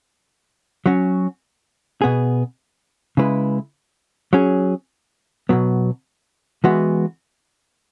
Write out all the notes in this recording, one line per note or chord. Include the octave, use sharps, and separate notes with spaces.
F#3 C#4 F#4
B2 B3 G#4
C#3 G#3 E4 B4
F#3 C#4 G#4
B2 F#3 B3
E3 G#3 B3 F#4